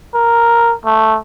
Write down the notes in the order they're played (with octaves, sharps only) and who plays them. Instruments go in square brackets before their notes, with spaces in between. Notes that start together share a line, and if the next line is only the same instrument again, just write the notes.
[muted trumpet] A#4
A3